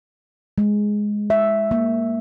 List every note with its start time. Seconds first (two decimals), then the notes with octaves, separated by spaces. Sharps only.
0.58 G#3
1.30 E5
1.71 A#3